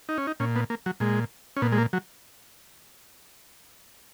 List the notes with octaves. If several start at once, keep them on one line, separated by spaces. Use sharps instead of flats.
D#4
C#4
D#4
A#2 C#4
B3
A#3
F#3
A#2 G#3
C#4
A#2 B3
G#3
A#3
F#3